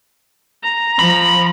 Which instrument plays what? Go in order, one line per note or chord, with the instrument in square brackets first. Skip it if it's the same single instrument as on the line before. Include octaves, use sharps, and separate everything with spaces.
[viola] A#5
[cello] F3 [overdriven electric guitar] B5